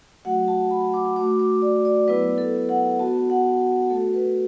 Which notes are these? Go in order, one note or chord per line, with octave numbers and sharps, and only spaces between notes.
F#3 A3 F#4 F#5
A5
B5
D6
A3 F#4 D6
D6
D5
D5
F#3 B3 E4 B4
A4
F#5
B3 F#4 A5
F#5
F#4
A3 F#4 A4
B4